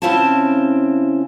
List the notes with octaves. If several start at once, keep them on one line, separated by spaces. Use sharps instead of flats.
C#3 C4 C#4 E4 G5 A5